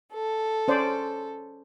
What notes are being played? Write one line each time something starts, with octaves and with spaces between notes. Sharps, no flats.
A4
C#4 C5 D5